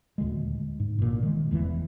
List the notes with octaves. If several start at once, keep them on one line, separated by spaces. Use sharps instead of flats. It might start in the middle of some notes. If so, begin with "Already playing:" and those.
D#1 D2 G#3
G#2
A1 A#2
D#3 G#3
F1 E2 E3